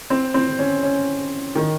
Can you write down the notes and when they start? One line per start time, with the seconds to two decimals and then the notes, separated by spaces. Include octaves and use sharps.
0.10 C4
0.34 C4
0.59 C#4
0.83 C#4
1.55 D#3